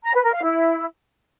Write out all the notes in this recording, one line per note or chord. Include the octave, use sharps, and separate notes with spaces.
A#5
B4
A#4
F5
E4